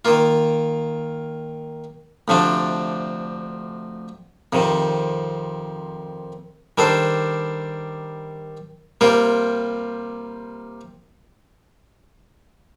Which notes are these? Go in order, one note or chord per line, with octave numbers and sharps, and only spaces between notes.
D#3 A#3 F4
D2 C3 F3 A3 D4
F2 C3 D#3
D#3 G3 D4 A4 C5
C3 G3 A#3 F4 A#4